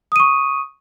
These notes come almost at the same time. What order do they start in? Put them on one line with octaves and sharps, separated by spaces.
D#6 D#7 C#6